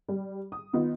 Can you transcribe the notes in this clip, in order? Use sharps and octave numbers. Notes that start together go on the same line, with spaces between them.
G3
D#6
D#3 B3 D#4 F4